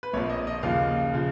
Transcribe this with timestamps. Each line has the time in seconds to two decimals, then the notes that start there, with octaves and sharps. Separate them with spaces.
0.03 B4
0.13 A#1 A#2 F3 C#5
0.30 D#5
0.47 D#5
0.63 D#2 C#3 F3 F5
1.14 C#3 F3